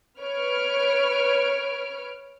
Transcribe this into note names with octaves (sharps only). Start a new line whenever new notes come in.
B4 C#5 F6 D7